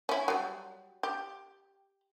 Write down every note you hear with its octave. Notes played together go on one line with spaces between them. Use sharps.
C#4 E4
F#3 G3
G4